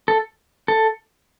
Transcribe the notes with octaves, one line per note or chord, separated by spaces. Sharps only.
A4
A4